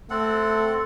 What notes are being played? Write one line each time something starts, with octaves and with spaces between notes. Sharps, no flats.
A3 C4 A4 F#5